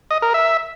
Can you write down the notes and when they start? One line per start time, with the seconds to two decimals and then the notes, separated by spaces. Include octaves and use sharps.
0.11 D#5
0.22 A#4
0.34 E5